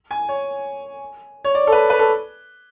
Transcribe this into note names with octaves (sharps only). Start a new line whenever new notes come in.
G#5
C#5
C#5
D5
A4
B4
B4
A4